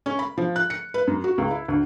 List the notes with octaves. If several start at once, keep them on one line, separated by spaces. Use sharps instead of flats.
C#4
B5
F3
F#6
C#7
B4
F#2
F#4
C#2
E4
D2